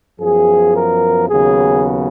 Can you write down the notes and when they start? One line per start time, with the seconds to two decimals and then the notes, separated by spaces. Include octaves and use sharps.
0.20 F#2 F3 B3 G#4
0.74 A#4
1.29 D#2 C#3 F#3 B3 G#4